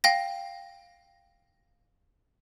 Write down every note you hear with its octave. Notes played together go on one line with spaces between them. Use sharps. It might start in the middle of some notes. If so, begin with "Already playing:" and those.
F5 G5 A#6